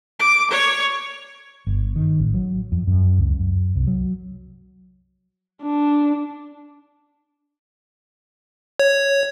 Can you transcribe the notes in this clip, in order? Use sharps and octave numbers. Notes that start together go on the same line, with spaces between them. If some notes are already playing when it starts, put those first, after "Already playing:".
D6
C#5
G1
D#3
A1
F#3
F2
F#2
C#2
F#2
C2
F#3
D4
C#5